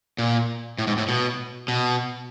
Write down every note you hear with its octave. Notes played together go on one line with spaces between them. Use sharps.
A#2
A2
G#2
A2
B2
B2